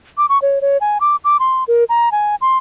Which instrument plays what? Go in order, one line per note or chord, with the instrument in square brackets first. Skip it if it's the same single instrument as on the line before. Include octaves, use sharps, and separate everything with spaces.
[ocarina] D6
C#6
C#5
C#5
G#5
D6
D6
C6
A#4
A#5
G#5
C6